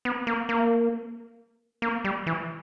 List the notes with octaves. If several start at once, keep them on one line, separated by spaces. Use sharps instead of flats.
B3
A#3
A#3
A#3
G3
E3